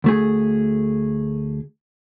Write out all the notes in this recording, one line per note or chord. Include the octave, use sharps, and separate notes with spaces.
D2 A3 G#4